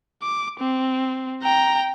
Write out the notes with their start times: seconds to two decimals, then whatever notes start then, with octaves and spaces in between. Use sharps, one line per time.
0.23 D6
0.60 C4
1.43 G5 A#5